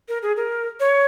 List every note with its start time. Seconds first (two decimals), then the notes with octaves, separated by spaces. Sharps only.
0.09 A#4
0.23 G#4
0.37 A#4
0.80 C#5